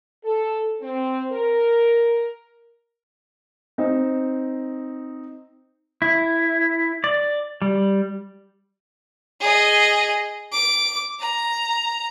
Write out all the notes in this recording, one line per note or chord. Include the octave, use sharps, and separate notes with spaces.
A4
C4
A#4
C4 D#4 C5
E4
D5
G3
G#4 D#5
D6
A#5